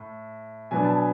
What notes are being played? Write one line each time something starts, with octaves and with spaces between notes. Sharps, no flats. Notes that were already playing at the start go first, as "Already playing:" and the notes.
Already playing: A2
B2 F#3 B3 D4 G#5
A5
G#5